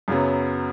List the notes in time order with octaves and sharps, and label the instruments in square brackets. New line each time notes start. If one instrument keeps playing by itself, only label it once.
[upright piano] F#2 C#3 F#3 B3